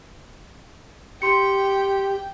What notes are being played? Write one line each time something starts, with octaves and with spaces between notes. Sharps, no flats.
G4 G5 C6 C#7